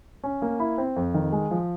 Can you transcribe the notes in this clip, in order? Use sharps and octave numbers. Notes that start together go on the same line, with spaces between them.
C#4
A#3
E4
C4
F2
D#3
G#3
F3